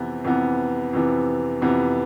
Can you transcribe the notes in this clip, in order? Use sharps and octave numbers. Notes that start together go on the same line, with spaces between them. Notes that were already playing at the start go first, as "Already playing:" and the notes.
Already playing: F2 C3 E3 B3
F2 C3 E3 B3
F2 C3 E3 B3
F2 C3 E3 B3